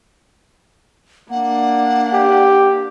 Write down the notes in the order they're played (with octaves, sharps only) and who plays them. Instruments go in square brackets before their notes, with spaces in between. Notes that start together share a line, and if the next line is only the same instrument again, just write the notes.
[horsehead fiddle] A#3 D4 [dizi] F#5
[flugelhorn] G4